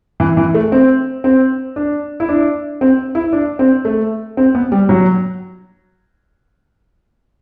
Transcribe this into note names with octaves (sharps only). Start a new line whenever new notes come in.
E3
E3
A3
C4
C4
D4
E4
D4
C4
E4
D4
C4
A3
C4
B3
G3
F#3